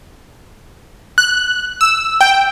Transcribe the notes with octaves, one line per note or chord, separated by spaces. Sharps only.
F#6
E6
G5